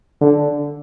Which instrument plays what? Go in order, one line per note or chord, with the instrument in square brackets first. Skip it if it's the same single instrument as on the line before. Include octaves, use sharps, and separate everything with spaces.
[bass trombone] D3